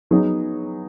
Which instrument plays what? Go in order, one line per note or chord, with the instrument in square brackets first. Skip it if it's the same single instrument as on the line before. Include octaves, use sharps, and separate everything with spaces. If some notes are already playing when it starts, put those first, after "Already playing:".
[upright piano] F#3 B3 D#4 G#4